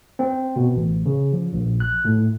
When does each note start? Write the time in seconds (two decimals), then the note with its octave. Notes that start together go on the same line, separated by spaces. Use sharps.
0.19 C4
0.56 B2
0.76 A1
1.06 C#3
1.32 F3
1.53 A#1
1.80 F#6
2.05 A2